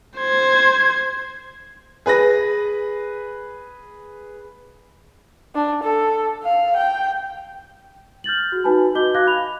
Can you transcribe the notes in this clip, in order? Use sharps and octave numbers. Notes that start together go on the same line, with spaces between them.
C5 G#6
G#4 B4 B5 A#6
D4
A4
F5
G5
F6 G6 A6 F#7
F#4 G#4
D#4 F#4 B4 G#5 A5 B5
F#4 D#5 D6 G6 G7
F#4 F5 D6 F#6 G#6 A#6
B5 F7